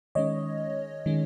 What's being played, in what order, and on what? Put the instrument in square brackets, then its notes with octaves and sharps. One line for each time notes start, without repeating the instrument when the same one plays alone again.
[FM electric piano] D#3 G#3 C#4 C#5 D#5
D#3 G#3 C#4